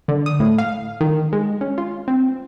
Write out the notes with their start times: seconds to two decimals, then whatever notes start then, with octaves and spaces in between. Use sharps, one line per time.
0.08 D3
0.26 D#6
0.40 A2
0.58 F5
1.01 D#3
1.33 G#3
1.61 C#4
1.78 F4
2.08 C4